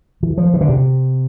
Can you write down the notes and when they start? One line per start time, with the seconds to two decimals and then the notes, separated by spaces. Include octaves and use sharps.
0.23 E3
0.38 F3
0.54 E3
0.61 D3
0.69 C3